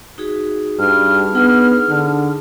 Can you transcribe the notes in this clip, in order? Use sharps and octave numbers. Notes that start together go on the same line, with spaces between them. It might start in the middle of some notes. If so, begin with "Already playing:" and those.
D#4 F#4 G#4
G2 F6
B3 D4 D#4 G#4
D3